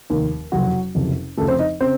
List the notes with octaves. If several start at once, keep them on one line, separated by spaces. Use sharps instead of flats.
F1 D#2 D#3
F#1 F2 C3 F#3 F#4
F#1 F2 C3
F1 F2 C#3 F3 A3 A4
C4 C5
D#4 D#5
C#3 C4 C5